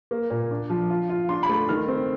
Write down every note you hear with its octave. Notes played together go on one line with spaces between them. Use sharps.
A#3
A#2
D4
F3
F4
F4
D4 C6
B5
A3
D#3 F6
C4